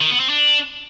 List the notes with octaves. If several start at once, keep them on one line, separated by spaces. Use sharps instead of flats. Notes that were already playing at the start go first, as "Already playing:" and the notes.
D#3
B3
C4
D4